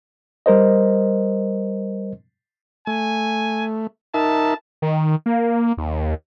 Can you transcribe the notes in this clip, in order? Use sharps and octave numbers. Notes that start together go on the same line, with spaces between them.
G3 A#4 C5 D#5
A3 G#5
D#4 A#4 E5 A5
D#3
A#3
D#2